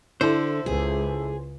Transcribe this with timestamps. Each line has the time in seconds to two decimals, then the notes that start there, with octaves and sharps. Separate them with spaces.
0.21 D3 E4 A4 C5
0.66 C#2 G#4